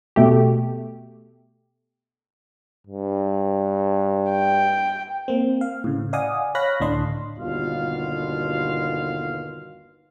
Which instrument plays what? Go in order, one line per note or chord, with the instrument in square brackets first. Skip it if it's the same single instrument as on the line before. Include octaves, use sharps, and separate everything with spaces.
[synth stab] B2 A3 G4
[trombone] G2
[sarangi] G5
[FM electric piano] A#3 C4
F5
A2 C#3
D5 D#5 F5 F#5 G#5 D#6
C#5 F5 B5 F#6 A#6 B6
C#2 A2 D3 D4 D#5 C6
[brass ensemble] G1 D#2 B2 F4 F5